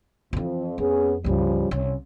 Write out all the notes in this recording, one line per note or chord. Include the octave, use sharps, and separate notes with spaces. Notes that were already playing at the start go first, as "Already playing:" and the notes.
F2 E3 F3
F2 B3 C#4 G#4
C#2 G2 C#3 F3 G3
C2 C#4